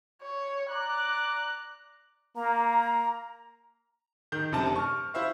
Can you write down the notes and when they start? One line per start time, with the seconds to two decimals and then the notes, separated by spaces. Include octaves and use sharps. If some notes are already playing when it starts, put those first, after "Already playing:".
0.22 C#5
0.70 D5 A#5 D6 F#6
2.36 A#3 A#5
4.32 D#3 G6
4.52 F1 F#2 C3 D4 A5
4.76 C#6 F6
5.14 E4 C5 E5 F5